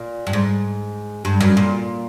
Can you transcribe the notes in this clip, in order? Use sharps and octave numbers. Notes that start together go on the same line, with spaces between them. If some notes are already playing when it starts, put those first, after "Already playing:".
Already playing: A#2
G2
G#2
G2
F#2
A#2